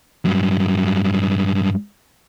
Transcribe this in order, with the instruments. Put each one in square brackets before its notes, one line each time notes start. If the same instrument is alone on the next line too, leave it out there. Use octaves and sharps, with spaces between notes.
[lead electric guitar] G2 F#3